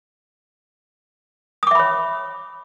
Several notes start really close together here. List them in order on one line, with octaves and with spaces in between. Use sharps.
D#6 D6 E5 B5 C#5